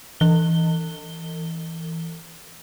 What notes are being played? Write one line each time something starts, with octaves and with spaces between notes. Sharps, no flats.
E3 G7